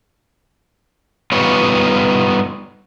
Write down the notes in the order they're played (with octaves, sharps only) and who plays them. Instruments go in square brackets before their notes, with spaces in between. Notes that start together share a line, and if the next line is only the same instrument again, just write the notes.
[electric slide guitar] G3 B3 D#4 F4 C#5